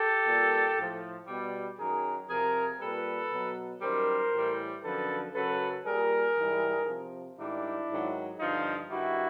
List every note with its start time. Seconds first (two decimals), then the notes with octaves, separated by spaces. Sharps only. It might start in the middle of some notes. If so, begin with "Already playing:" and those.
Already playing: G4 A4
0.25 A#2 G3
0.76 A2
0.82 F3
1.28 B2 G3
1.79 F#2 D#3 F#3 G#4 A#4
2.29 C3 F3 G#4 A#4
2.80 A#2 G3 A4 B4
3.32 B2 F#3
3.81 F#2 D#3 G3 A#4 C5
4.32 A2 E3 G3
4.84 F#2 D3 F3 A4 B4
5.34 F#2 C#3 F#3 A4 B4
5.85 A#2 G3 G#4 A#4
6.37 G#2 E3 G3
6.87 C3 F3
7.38 G#2 D#3 G3 D4 E4
7.89 G#2 D#3 F#3
8.40 G2 D3 F3 D#4 F4
8.90 G2 D#3 G3 E4 F#4